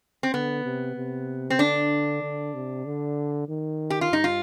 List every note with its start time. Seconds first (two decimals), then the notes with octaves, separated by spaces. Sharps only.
0.23 C4
0.34 D3 B3
0.66 C3
0.97 C3
1.50 C4
1.59 D3 D4
2.22 D3
2.54 C3
2.86 D3
3.49 D#3
3.90 G4
4.01 F4
4.11 G2 D#4
4.24 F4